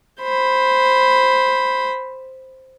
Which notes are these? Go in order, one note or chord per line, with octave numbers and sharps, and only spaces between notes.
C5 B5